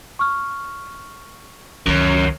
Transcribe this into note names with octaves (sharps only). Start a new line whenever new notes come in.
C#6 F6
C#2 F#2 D#3 A#4 C#5